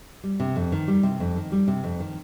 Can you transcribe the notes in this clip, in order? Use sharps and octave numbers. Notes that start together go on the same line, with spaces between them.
G3
C3
F2
D#3
G3
C3
F2
D#3
G3
C3
F2
D#3